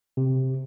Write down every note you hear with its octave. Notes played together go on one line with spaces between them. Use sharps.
C3